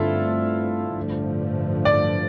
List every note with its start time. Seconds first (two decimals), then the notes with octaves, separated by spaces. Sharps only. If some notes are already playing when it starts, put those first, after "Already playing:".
Already playing: G2 D3 A3 C4 E4 F4 A4
0.97 A1 G2 D3 F3 A3
1.85 D5